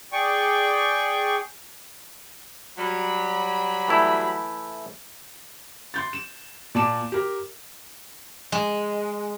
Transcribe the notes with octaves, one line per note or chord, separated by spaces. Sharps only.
G#4 D5 G5 C#6
F#3 G3 B5
E3 A3 E4
C6 G6 A6
E7
A#2 D5 A5 D6 E7
G4 A#4
G#3